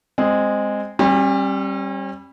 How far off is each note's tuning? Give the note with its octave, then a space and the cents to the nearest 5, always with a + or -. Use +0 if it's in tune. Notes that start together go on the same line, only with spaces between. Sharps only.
G#3 -10 C4 +0
G3 +0 C#4 -45